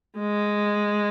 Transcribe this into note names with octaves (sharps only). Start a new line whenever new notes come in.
G#3